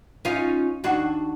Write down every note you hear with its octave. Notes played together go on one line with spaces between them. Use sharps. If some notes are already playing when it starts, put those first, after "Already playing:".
C#4 D#4 F4
D#2 D4 F#4